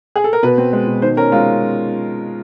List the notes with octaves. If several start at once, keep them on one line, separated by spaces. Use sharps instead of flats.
G#4
A4
A#4
B2 B4
C4
G#3
B2
D#3 C5
C#4 A#4
G#3 F4